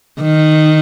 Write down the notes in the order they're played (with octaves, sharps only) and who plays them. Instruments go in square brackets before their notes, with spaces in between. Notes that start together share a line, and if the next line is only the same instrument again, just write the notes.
[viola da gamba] D#3